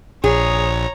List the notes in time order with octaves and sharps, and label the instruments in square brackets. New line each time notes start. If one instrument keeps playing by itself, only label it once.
[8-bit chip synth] A#1 [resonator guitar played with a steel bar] G#4 [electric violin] C#5 A#5